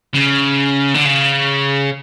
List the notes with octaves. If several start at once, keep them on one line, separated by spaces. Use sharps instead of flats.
C#3
D3
C#3